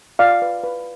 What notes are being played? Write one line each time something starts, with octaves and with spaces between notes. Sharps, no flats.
F4 D5 F5
B4
B4